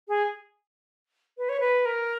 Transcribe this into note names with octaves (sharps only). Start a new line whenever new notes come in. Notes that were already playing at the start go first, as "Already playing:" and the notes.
G#4
B4
C#5
B4
A#4